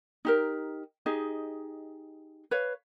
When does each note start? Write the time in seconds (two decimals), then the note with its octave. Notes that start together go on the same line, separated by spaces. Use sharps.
0.25 D#4 G4 A#4
1.06 D#4 G4 G#4 D#5
2.51 B4 C#5 F5